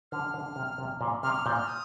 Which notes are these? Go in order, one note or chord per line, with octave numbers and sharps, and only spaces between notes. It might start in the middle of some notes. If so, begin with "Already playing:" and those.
D3 F6
D3
C3
C3
A#2
C3 F6
F6
A#2 G6
F6
D#6